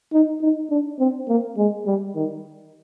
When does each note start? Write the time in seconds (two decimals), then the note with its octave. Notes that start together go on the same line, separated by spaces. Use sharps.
0.12 D#4
0.41 D#4
0.70 D4
0.99 C4
1.28 A#3
1.57 G#3
1.86 G3
2.15 D#3